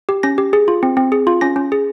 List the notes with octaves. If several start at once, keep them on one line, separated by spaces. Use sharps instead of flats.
G4
C#4 A#6
G4
G#4
F4
C4
C4
G#4
F4
C#4 A#6
C#4
G#4